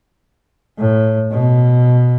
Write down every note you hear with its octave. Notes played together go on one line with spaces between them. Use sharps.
A2
B2